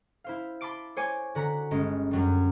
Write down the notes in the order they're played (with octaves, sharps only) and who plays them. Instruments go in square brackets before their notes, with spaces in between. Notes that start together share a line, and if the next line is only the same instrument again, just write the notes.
[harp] E4 C5 F5
A5 B5 C6 D6 D7
C5 C#5 G#5 D6
D3 F#4 A#5 B6
G1 G#3 C#4
F#2 F#3 G3